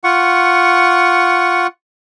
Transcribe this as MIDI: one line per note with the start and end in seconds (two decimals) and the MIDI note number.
0.04 1.67 65
0.04 1.67 78
0.04 1.67 85